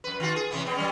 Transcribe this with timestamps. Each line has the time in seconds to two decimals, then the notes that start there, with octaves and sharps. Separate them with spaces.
0.04 F#2 B4
0.20 D#3 F4 F#4
0.36 G#4
0.51 C3 E3 B3
0.65 B2 B3
0.76 F#3 G3 C#4